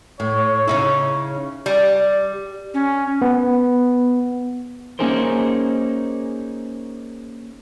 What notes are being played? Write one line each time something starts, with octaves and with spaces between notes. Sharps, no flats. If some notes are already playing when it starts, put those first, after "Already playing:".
A2 C#5
C#3 D#4 E4
G3
C#4
B3
A#3 C#4 D#4 G#4 A#4 C5